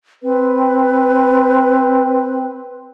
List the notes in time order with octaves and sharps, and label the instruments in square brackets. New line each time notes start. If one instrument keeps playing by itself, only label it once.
[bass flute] C4 [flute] B4